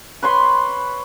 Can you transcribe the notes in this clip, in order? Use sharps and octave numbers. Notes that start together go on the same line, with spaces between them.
B4 C#5 B5 C6